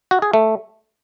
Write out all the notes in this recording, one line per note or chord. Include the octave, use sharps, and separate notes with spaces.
F#4
G#4
A3